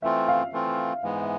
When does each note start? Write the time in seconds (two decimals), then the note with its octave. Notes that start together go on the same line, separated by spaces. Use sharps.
0.02 E3 A3 C4 F4 E5
0.28 F5
0.52 E3 A3 C4 F4
1.03 G#2 E3 G#3 B3 F5
1.21 E5